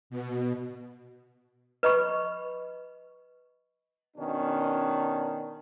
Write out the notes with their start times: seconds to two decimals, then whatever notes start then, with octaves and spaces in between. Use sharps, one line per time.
0.10 B2
1.83 B4 D#5 B5 C#6
4.17 B2 D#3 C#4 D4